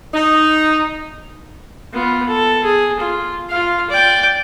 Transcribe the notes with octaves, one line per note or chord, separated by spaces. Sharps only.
D#4
B3 F4
A4
G#4
F4
F4 F5
D5 G5